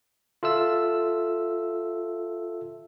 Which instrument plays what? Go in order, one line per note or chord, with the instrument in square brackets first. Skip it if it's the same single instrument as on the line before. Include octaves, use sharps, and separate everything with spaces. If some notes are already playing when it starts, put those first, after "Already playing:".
[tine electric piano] F4 A4 E5 E6